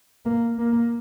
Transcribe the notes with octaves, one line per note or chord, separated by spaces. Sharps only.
A#3
A#3